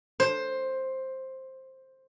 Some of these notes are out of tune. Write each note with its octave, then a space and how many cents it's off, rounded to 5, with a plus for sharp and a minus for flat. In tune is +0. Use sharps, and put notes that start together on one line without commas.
C5 +10